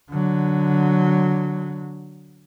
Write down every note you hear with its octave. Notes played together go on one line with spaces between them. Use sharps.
D3 F#3